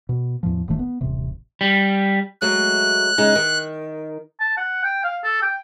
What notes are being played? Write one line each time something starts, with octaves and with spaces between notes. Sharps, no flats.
B2
E2 A2 F3
E1 A1 D#3 A3
B3
D#1 A1 C3
G3
F#3 G#3 A3 F#6
C#3 G#3 D#4
D#3
A5
F#5
G5
F5
A4
G5